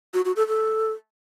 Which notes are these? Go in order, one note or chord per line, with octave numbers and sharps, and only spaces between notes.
F#4
F#4
A4
A4